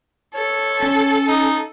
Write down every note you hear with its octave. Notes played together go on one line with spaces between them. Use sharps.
A4 C#5
C#4
D#4